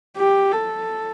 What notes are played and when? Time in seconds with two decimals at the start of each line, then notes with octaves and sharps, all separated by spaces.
0.17 G4
0.52 A4